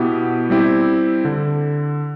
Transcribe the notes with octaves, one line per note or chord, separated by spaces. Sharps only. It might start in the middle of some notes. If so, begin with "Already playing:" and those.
Already playing: B2 B3 E4 G4
G3 C4 E4 G4
D3